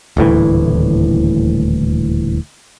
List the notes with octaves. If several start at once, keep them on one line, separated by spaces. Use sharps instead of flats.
D#1 D2 A2 E3